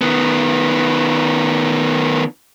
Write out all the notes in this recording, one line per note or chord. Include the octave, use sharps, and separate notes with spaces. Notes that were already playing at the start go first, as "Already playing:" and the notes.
D#3 B3